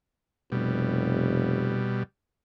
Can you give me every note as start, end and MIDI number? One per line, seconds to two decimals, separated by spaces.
0.52 1.94 29
0.52 2.03 47
0.52 2.03 55